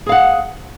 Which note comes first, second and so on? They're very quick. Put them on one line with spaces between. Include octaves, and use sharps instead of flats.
G#4 F5 F#5